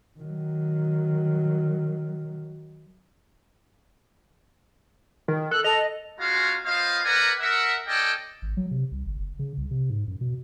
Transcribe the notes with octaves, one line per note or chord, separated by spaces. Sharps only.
D#3 F#3
D#3
A4 F#6
A4 D#5 F7
G#3 C#4 F4 F#4 F5 A#5
B3 F4 C5 D#5 F5
A#4 B4 D5 F#5 G#5 A#5
A#4 E5 F#5
C#4 A4 D5 D#5 G5
G#1
F#3
C3
C2
G1
F#1
C#3
C2
C3
G#2
F#2
B2